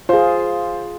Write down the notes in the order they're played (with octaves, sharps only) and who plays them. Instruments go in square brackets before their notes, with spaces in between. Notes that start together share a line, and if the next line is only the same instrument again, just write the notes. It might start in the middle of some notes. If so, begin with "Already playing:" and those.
[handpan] F4 G#4 [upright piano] C5